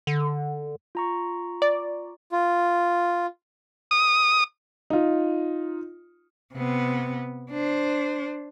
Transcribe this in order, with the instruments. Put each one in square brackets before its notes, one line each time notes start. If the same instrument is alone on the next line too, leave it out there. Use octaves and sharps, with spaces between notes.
[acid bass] D3
[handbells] F4 A#5 C#6
[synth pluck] D5
[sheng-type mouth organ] F4
[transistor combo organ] D#6
[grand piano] D#4 F4
[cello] C3 B3
D4 C5